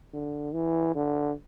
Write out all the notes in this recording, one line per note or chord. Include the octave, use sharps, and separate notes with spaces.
D3
E3
D3